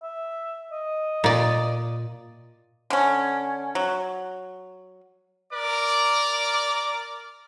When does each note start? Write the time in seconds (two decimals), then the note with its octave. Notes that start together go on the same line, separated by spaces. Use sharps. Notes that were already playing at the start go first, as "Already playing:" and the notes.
0.03 E5
0.72 D#5
1.24 A#2 D5
2.90 D3 C#4
3.75 F#3
5.53 A#4 D5 D6